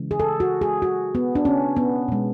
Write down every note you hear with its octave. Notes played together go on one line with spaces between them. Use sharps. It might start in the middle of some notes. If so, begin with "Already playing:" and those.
Already playing: C#3 E3 G#3
G#4
A4
F#4
G#4
F#4
B3
D4
C#4
B3
B2 G#3